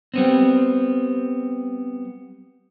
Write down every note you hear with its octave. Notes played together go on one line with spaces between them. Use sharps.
G3 B3 C4